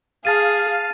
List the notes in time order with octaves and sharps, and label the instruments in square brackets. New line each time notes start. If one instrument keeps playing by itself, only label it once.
[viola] G#4 [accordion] F5 [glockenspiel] A5 A6 D#7